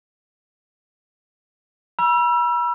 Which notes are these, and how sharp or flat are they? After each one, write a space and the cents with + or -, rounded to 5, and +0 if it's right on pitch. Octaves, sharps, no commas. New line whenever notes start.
B5 -40 E6 +25